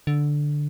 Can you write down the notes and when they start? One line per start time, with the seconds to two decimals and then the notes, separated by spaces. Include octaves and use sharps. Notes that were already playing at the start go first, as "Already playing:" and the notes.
0.07 D3